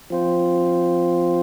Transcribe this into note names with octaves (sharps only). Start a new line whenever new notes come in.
F3 C4 F4 C5